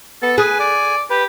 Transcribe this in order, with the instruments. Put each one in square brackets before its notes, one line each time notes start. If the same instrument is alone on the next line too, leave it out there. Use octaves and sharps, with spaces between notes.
[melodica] B3 [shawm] A4
[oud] G#4 [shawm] B4 [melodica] G#5
[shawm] D5
[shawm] G4 [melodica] B4